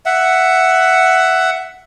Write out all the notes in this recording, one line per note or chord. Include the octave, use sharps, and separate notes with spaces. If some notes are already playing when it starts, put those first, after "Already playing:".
E5 F#5